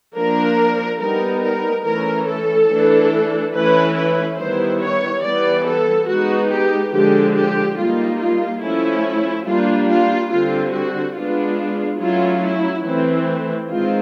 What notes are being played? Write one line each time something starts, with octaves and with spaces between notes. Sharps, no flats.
F3 A#3 D4 A#4
G3 B3 D#4 A#4
A#4
E3 A3 C#4 A#4
A4
E3 A3 D4
E3 A3 C#4 E4 B4
B4
D#3 G3 B3 E4 C5
C#5
E3 G3 B3 D5
A4
G#3 B3 D#4 F#4
G4
D3 F3 G#3 G4
G4
G3 A#3 D#4 F4
F4
F3 A3 C#4 E4
G3 A#3 D4 F4
F4
D3 G3 C4 F4
F#4
G#3 B3 D4 F4
F#3 A3 C#4 E4 F4
E4
E3 A3 C4 E4
D#3 G#3 C4 F4